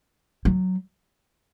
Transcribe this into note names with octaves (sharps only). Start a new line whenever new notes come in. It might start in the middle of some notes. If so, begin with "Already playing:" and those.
F#3